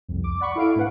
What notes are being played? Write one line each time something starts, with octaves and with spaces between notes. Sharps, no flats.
C2 F2
D6
D5 F#5 B5 C#6
E4 A4 F5 D7
A2 D4 B4 F#5